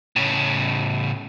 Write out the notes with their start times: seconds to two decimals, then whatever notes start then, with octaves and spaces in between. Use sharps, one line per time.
0.16 A2 C#3